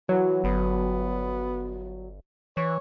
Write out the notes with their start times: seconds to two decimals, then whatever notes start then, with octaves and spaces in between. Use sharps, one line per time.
0.09 E3 F#3
0.44 G1 B3
2.57 E3 C#5